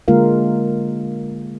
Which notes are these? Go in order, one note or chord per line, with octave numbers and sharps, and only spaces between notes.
D3 G#3 A#3 F4 A#4 F5